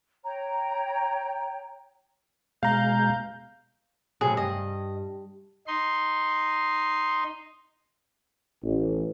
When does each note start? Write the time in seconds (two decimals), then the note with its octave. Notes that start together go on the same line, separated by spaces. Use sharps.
0.24 C#5 G5 A#5
2.63 B2 G#3 F5 A#5 G6
4.21 A2 C3 F#3 G#4
4.37 G2 D#5
5.67 D#4 C6
8.63 A1